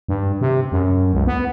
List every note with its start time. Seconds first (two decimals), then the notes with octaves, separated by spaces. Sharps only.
0.08 G2
0.41 C3
0.72 F#2
1.14 C#2
1.27 B3